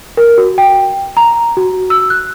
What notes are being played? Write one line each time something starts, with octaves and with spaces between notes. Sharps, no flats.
A#4
F#4
G5
A#5
F#4
E6
F#6